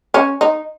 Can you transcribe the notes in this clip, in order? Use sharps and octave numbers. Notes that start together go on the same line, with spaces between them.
C#4
D#4